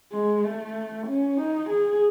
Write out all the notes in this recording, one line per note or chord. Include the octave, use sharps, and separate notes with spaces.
G#3
A3
C#4
D#4
G#4